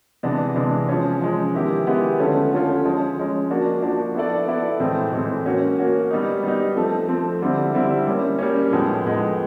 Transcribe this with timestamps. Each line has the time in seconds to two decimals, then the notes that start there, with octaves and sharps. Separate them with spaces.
0.23 C3 E3 G#3 B3 D4
0.56 C3 E3 G#3 B3 D4
0.89 F3 G#3 C#4
1.21 F3 G#3 C#4
1.54 D#3 G#3 B3 E4 G4
1.87 D#3 G#3 B3 E4 G4
2.19 D3 F3 A3 C#4 F4
2.51 D3 F3 A3 C#4 F4
2.85 F3 G#3 C#4
3.17 F3 G#3 C#4
3.49 F3 A#3 D4 F#4
3.82 F3 A#3 D4 F#4
4.15 B3 E4 A4 D5
4.47 B3 E4 A4 D5
4.80 A2 E3 G#3 C4
5.13 A2 E3 G#3 C4
5.45 A#3 C#4 F#4
5.78 A#3 C#4 F#4
6.11 G3 B3 D#4
6.43 G3 B3 D#4
6.76 F3 A3 C4
7.08 F3 A3 C4
7.42 D3 G3 C4 E4
7.74 D3 G3 C4 E4
8.06 G3 A#3 C#4
8.39 G3 A#3 C#4
8.71 A2 F3 G#3 B3 D#4
9.04 A2 F3 G#3 B3 D#4